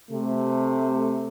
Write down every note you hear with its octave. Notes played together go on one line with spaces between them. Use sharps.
C3 A3